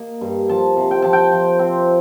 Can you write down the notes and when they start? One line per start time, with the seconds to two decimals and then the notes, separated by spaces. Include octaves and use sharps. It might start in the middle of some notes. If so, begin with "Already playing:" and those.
Already playing: A#3 D#5
0.21 G2
0.49 F3 A5
0.77 C3
0.91 G5
1.02 F3 A5
1.13 G5
1.32 F3
1.59 C4